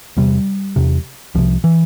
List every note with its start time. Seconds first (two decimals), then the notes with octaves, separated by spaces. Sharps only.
0.17 E2 C3 G3
0.76 E2 C3
1.35 C2 C3 F3
1.64 E3